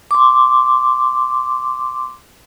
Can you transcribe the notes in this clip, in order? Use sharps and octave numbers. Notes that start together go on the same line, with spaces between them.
C6 D6